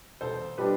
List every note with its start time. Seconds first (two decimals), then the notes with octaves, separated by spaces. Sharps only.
0.21 E1 A4 C5
0.58 B2 G3 D4 G4 B4